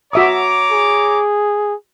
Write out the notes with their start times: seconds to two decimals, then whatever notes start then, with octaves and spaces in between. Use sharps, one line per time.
0.13 F#4 C#5 E5 A#5 D6 D#6
0.72 G#4